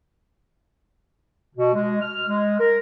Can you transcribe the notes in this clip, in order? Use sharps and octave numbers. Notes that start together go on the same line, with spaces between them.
B2
G#3
F6
G#3
A#4